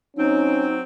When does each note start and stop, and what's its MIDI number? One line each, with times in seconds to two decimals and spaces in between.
0.17 0.81 54
0.17 0.81 60
0.17 0.67 61
0.17 0.76 63